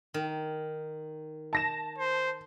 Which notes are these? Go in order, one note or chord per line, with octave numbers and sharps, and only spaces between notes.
D#3
A5 A#6 E7
C5